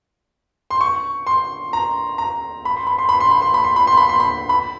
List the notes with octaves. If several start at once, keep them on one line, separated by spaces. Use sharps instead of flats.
C6
C#6
C6
A#5
A#5
B5
C6
B5
C6
B5
C6
B5
C6
B5
C6
B5
C6
B5
C6
B5
B5